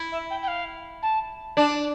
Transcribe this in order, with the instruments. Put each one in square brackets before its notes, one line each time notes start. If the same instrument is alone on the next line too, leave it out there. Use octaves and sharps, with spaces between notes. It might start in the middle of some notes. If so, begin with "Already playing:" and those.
Already playing: [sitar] E4
[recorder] E5
G5
G5
F5
A5
[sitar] D4 [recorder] A5